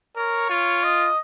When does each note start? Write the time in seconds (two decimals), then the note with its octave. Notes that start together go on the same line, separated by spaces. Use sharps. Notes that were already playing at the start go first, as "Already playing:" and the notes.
0.17 A#4 C#5
0.50 F4
0.83 D#5